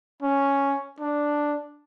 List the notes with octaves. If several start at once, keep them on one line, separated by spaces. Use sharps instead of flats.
C#4
D4